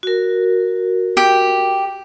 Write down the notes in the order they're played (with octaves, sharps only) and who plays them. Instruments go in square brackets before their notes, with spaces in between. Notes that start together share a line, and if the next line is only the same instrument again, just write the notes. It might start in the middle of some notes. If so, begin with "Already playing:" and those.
[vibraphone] F#4 A#4
[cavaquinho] G4